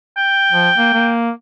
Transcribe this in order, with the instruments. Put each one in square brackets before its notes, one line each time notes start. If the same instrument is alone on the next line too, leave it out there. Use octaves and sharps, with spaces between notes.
[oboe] G5
[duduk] F3
A#3
A#3